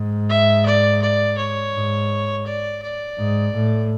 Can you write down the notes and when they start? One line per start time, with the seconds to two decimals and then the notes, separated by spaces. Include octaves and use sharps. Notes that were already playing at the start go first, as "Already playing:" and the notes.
Already playing: G#2
0.29 E5
0.66 D5
1.01 D5
1.38 C#5
1.74 G#2
2.46 D5
2.82 D5
3.18 G#2
3.55 A2